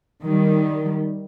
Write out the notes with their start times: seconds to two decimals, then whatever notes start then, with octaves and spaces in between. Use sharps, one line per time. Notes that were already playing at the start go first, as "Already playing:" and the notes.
0.23 D#3 G3